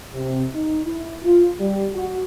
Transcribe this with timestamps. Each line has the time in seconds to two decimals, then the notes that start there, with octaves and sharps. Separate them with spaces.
0.14 C3
0.54 D#4
0.85 E4
1.24 F4
1.60 G3
1.93 F#4